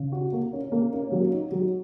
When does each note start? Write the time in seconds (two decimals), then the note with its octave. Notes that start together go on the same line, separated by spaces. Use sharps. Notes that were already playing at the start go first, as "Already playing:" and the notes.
Already playing: C#3
0.12 F#4
0.33 A#3
0.53 C#4
0.72 A#3
0.93 C#4
1.12 F#3
1.32 D#4
1.52 F#3